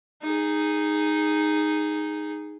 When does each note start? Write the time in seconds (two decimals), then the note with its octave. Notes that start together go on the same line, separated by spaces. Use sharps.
0.22 D#4 G#4